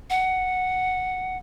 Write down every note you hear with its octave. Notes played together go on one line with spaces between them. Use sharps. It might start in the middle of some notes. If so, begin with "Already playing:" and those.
F#5